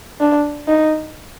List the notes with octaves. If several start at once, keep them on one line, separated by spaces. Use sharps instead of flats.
D4
D#4